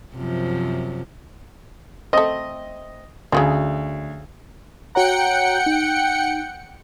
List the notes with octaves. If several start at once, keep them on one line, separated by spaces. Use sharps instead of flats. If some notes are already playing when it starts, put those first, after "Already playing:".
F#2 C3 F3
A3 C4 D#5
D2 C#3 E3 F#3
F#4 C#5 F#5 G5 A#5 C#7
D#4